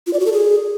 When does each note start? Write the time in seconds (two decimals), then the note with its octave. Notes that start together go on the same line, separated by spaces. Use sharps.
0.07 F4
0.13 D5
0.20 F#4
0.26 A4
0.32 G#4